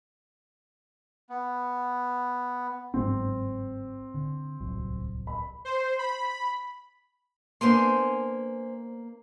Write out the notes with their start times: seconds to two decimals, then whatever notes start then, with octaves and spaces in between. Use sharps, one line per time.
1.30 B3
2.94 G1 G#2 F#3 C4
4.14 D3
4.61 D1 C2 F#3
5.27 B5
5.65 C5
5.99 B5
7.61 A#3 B3 D4 C5 G#5 C6